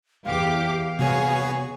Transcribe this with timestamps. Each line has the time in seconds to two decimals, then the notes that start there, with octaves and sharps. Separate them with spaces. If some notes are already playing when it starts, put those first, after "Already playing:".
0.25 E2 G4 F5 D6
0.99 C3 G3 B3 F#4 G#4 C#5